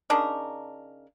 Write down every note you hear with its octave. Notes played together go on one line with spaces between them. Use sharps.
C#3 D4 D#4 A#4